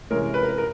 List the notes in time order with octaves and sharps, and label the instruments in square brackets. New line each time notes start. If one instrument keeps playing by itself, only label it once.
[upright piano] C3 E3 G#3 C#4 A#4
B4
A#4
B4
A#4